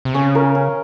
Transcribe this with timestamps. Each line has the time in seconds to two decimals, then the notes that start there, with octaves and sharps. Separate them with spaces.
0.05 C3
0.14 C#3 C#4
0.35 A#4
0.55 C#4